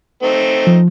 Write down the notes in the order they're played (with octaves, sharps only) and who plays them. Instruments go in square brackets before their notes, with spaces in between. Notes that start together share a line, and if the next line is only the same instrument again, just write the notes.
[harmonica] A3 C4 D#4
[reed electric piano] F3